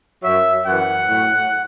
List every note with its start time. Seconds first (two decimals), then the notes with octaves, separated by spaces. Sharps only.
0.22 F#2 F#3 E5
0.66 F#2 E3 F#5
1.09 A2 F#3